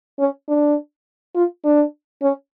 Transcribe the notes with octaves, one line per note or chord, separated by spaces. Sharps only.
C#4
D4
F4
D4
C#4